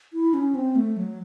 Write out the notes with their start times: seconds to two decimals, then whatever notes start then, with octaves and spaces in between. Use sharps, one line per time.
0.13 E4
0.34 C#4
0.55 C4
0.76 A3
0.97 F#3